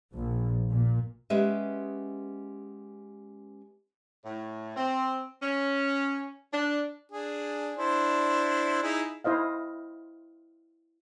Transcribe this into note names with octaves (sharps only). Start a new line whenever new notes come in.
A#1
A#2
G#3 B3 C#4 G4 B4 E5
A2
C4
C#4
D4
D4 G#4
D4 E4 C5
D#4 E4 G#4
E4 C5 D#5 F5